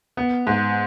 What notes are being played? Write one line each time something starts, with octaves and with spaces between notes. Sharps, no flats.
B3
G#2